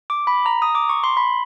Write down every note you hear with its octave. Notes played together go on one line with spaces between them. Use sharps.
D6
B5
A#5
D#6
D6
C#6
C6
B5